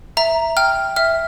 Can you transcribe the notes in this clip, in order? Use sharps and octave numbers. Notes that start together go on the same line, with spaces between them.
E5 A#5
G5 F6
E5 F6